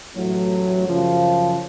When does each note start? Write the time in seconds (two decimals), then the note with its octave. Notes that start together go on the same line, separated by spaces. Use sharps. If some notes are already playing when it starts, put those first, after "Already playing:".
0.14 A1 A2 F#3 A3
0.85 F#2 C#3 F3